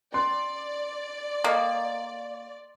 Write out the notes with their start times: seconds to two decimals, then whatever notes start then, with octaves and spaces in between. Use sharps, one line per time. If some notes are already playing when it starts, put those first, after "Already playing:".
0.14 C#4 D5 C6
1.44 A#3 A4 D#5 G5